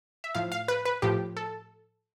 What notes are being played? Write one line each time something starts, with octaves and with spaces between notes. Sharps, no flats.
E5
A2 F3 F5
F5
B4
B4
A2 F3 G4
A4